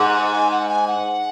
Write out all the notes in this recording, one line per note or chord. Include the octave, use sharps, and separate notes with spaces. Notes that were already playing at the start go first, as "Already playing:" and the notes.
Already playing: G#2 F#5
G#5
F#5
G#5
F#5